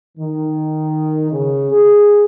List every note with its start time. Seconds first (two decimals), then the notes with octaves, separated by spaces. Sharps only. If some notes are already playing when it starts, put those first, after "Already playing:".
0.18 D#3
1.31 C#3
1.71 G#4